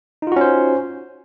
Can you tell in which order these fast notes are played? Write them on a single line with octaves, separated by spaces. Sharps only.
D#4 F4 F#4 C#4 C5